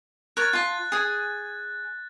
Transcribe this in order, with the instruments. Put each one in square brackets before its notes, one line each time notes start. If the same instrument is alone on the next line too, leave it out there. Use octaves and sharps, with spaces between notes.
[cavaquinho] A#4 C#5 [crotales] F#6 A6
[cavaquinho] F4 A5
G#4 G#5